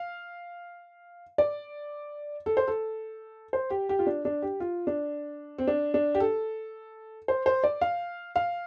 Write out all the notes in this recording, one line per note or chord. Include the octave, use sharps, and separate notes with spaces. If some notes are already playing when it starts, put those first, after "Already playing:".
Already playing: F5
D5
A4
C5
A4
C5
G4
G4
F4
D4
D4
G4
F4
D4
C4
D4
D4
G4
A4
C5
C5
D5
F5
F5